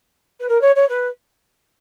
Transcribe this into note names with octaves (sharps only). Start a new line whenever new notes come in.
B4
A#4
C#5
C#5
B4